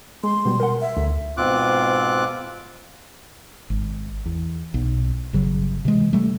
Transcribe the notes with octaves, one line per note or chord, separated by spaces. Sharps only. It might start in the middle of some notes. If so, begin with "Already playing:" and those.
G#3 C6
B2 G3
A#4 F#5
E5
D2
G#2 B2 C4 F4 D6 F#6
G#1
E2
B1
G1 C#3 F#3
C3 E3 G#3
C3 G3 A3